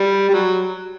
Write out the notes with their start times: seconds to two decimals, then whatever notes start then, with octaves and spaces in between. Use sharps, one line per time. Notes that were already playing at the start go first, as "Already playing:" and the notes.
Already playing: G3
0.29 G3
0.34 F#3